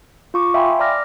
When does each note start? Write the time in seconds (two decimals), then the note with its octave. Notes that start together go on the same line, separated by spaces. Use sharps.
0.34 F4 C#6 D6
0.54 E5 F5 G5 G#5 B5 C6
0.80 D5 A#5 D6 F6 A#6